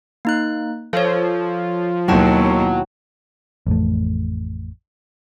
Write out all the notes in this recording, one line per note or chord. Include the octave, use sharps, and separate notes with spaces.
A#3 D#4 F#6
F3 A4 C#5
D#2 B2 F#3 E4 F4 G5 A5
A1 F2 A3